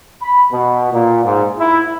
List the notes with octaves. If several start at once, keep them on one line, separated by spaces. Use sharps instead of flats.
B5
B2
A#2
G#2
E4